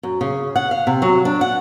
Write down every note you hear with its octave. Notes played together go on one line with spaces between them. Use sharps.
F#2
C#3
F#5
F5
C3
F#3
D4
F#5